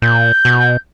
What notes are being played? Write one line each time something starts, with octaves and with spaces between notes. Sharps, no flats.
A#2 G6
B2